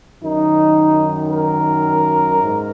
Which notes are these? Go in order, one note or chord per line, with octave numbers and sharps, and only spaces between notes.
F#2 D#3 D#4
A#4
G#2